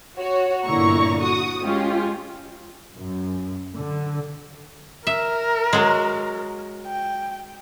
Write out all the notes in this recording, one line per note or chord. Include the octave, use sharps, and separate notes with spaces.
F#4 C#5
G1 A#2 D3 E4 A#5 C#6
F#4 C#6 D#6
G#3 C#4 F4 G4
F#2
D3
A#4 E5
F#3 G#3
G5